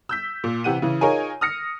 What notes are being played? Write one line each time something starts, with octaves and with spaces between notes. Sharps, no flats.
E6 G6 B6
A#2
C3 E3 G4 F#5 D#7
C#3 E3
D#4 F4 G#4 A#4 C#5 G#5
D#6 F6 A#6 C#7